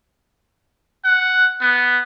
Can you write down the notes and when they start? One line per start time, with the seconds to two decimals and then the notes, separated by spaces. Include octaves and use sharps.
1.05 F#5
1.61 B3